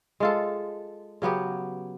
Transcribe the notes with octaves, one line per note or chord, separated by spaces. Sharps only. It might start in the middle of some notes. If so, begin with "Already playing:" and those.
G#3 F4 A4
C#3 F#3 B3 G4